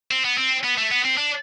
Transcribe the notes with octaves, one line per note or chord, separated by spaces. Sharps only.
C4
B3
C4
B3
A3
B3
C4
D4